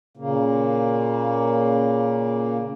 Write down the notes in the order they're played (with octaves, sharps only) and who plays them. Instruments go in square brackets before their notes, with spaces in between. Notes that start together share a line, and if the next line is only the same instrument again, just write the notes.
[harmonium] A#2 C#3 A#3